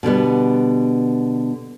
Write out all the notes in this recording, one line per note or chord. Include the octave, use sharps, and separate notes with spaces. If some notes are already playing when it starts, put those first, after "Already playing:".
B2 D3 G3 B3